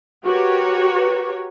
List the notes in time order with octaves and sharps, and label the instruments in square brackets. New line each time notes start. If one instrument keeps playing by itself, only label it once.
[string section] F#4 G4 A#4 B4 C#5